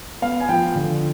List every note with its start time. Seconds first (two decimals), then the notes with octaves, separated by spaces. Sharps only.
0.22 B3 F5
0.40 G#5
0.49 F3 G5
0.75 D3